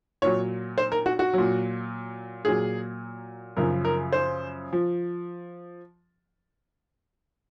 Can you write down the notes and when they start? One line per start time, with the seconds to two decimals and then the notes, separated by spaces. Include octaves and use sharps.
0.22 A#2 F#3 C#5
0.78 C5
0.92 A#4
1.06 F#4
1.19 F#4
1.33 A#2 F#3
2.45 A#2 F#3 G#4
3.57 F#2 C#3 F3 A#4
3.85 A#4
4.13 C5
4.73 F3